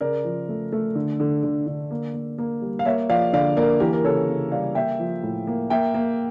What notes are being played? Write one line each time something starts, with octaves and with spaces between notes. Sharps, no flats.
C#3 A#4 D5
F3
A3
A3
D3
D3
D3
D3
A#3
A#3
A#3
G3
F5
A#3 C#5 E5
F3 D5 F5
D3 D5 F5
A#3 A#4 D5
E3 G4 A#4
A#4
C#3 A4 C#5
C#3
G3 D5 F5
A#3 E5 G5
F3
A2
A#3
A#3 E5 G5
A#3